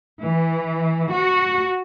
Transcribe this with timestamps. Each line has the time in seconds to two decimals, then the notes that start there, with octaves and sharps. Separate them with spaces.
0.22 E3
1.11 F#4